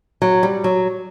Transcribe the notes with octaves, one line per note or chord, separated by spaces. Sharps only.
F#3
G3
F#3